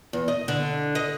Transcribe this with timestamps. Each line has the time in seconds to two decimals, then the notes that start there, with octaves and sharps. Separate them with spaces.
0.13 E2
0.28 D#5
0.48 D3
0.95 D#5